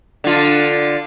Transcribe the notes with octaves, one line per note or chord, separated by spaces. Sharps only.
D3 F4